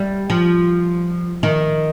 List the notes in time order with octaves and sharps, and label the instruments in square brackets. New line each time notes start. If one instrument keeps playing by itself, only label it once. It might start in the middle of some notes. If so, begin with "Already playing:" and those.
Already playing: [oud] G3
F3
D#3